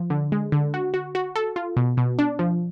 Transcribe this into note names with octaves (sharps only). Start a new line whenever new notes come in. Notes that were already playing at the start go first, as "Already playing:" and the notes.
Already playing: F3
D3
G#3
D3
F#4
F#4
F#4
A4
F4
B2
B2
D4
F3